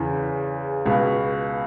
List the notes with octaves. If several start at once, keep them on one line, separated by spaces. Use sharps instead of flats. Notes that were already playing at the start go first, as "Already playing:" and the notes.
Already playing: E2 C#3 E3
C#2 B2